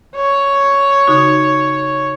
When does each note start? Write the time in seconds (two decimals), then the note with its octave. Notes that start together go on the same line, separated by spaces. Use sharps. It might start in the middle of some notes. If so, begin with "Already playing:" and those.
0.16 C#5
1.08 C#3 D#4 F#4